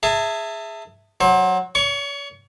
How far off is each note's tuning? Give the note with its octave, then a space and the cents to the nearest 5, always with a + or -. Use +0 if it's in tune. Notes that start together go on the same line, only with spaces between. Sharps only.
G#4 +0 E5 +0 A5 +30
F#3 +0 C5 +30
C#5 +40 C#6 +15